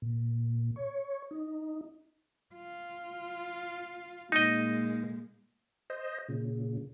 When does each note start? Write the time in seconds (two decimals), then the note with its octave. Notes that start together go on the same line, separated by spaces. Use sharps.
0.02 A#2
0.76 C#5
1.31 D#4
2.54 F4
4.32 A#2 G#3 D#4 D#5
5.90 C5 D#5
6.28 A#2 C#3